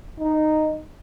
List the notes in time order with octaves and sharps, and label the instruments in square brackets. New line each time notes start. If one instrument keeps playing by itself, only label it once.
[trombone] D#4